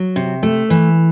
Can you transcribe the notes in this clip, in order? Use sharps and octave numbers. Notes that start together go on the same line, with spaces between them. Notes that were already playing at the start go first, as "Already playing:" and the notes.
Already playing: F#3
C3
A3
E3